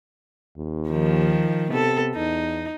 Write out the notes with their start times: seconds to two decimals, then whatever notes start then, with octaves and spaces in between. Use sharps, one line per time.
0.57 D#2
0.90 D#3 F3
1.70 C3 B3 A4
2.16 E2 D#4